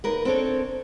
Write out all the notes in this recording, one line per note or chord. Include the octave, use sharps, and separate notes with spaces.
D#2 A#4 B4
C4 D4 A4 C#5